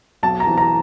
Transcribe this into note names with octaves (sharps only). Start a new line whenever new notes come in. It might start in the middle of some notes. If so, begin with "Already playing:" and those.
B1 A5
A#5
E3
A#5